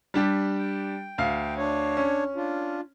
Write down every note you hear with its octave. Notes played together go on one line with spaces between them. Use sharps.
G3 D4 G4
G5
D2 F5
D4 C#5
C#4
D4 F4